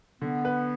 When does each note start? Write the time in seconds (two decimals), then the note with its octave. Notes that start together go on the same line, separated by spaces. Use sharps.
0.22 D3 B3
0.45 B4